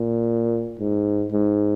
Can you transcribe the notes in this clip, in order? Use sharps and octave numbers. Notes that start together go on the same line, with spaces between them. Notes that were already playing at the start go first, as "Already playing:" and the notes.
Already playing: A#2
G#2
G#2